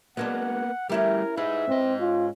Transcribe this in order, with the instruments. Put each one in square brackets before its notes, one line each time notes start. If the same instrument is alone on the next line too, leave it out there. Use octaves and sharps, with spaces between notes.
[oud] F#3 G#3 D4 [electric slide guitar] A#3 B3 [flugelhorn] F#5
[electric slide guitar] G3 A3 [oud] C#4 E4 G4 [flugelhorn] A#4
[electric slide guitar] D#4 G#4 [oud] B4 [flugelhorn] E5
[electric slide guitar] G#2 D#5 [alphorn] C4
[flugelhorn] C#4 [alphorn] F4